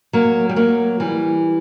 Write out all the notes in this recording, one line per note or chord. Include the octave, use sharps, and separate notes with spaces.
F#3 A#3
G3
F#3 A#3
E3 G3